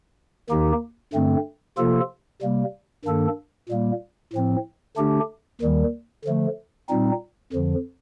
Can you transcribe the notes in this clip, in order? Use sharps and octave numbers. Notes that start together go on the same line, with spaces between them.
D#2 D#3 A#3 D#4 G4
G2 D3 A3 C4
C3 F3 A#3 F4 A4
C3 G3 A#3
G2 D#3 A#3 D4 A4
A#2 G3 A#3
A2 F3 C4
D3 A3 D4 G4
D#2 D#3 G3
D3 F3 A3
A#2 G3 C4 D#4
F2 D3 F3